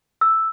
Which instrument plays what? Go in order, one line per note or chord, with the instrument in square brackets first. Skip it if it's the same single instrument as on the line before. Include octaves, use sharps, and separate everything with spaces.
[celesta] E6